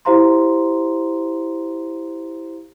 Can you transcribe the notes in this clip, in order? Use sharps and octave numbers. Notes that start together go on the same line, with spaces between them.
E4 G4 C5 F5 A#5 C6